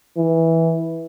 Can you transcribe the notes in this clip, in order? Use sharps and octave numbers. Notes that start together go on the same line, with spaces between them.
E3